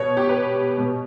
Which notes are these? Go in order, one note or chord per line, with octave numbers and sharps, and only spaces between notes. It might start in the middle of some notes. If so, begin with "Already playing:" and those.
Already playing: B2 C#5
G4
B4
B2